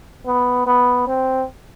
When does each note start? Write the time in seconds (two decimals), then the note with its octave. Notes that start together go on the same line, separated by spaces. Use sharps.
0.26 B3
0.67 B3
1.07 C4